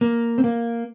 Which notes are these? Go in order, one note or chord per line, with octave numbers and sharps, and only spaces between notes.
A#3
C4
A#3